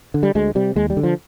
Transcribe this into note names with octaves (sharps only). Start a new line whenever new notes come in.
D3
G3
D2 G#3
C3 G3
D#2 G#3
G3
D3
F3